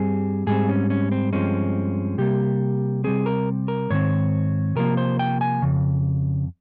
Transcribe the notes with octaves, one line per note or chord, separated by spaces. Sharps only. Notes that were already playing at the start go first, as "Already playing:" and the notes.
Already playing: G2 G3 C4 G#4
G#2 G3 C4 G#4
C#4
C#4
C4
G2 F3 G#3 C4 C#4
C3 G3 A#3 G4
C3 G3 C4 G#4
A#4
A#4
G#2 D#3 C4 C#5
C3 F3 A#3 A#4
C5
G5
G#5
F2 C#3